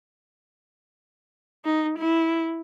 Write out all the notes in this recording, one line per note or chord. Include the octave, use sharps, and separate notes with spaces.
D#4
E4